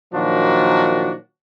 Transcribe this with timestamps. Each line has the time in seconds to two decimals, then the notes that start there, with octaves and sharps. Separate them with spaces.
0.13 A#2 D#3 F3 F#3 D4 F#4